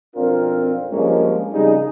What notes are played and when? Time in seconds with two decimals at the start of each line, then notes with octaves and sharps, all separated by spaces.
0.15 B1 F2 C4 D4 F4 A#4
0.91 G2 F3 G#3 A#3 C#4
1.53 F2 C#3 G3 D#4 G#4